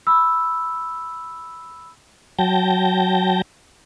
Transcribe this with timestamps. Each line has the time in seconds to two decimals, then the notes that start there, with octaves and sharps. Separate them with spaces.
0.07 B5 E6
2.39 F#3 G5 A5 G6 A#6